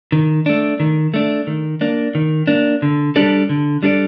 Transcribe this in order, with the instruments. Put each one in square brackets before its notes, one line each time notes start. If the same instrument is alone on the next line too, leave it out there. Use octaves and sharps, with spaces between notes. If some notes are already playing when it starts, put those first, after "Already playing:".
[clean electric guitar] D#3
A3 D4
D#3
A3 D4
D#3
A#3 D4
D#3
A#3 D4
D3
G3 D4 A4 D5
D3
G3 D4 A4 D5